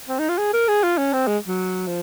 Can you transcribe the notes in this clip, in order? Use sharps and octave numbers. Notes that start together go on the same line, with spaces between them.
C4
D#4
F4
G#4
A#4
G#4
F4
C#4
C4
G#3
F#3
F3